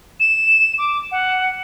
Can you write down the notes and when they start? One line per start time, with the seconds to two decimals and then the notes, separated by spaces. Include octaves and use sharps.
0.20 E7
0.78 D6
1.11 F#5